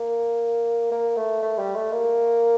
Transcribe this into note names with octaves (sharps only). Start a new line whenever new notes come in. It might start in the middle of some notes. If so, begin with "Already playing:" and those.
Already playing: A#3
A#3
A3
A3
G3
A3
A#3